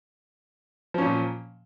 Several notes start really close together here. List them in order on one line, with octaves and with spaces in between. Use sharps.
F3 C#4 A#2